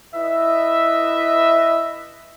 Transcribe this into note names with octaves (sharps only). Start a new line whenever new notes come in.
E4 B4 D#5 E5